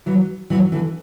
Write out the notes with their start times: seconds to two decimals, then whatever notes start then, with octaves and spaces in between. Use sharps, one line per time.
0.06 E3 F#3
0.50 E3 F#3
0.72 D3 E3